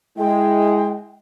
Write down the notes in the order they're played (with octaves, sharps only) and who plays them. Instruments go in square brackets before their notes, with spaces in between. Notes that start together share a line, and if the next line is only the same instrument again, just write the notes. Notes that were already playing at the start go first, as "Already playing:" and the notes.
[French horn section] G#3 [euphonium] E4 [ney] G5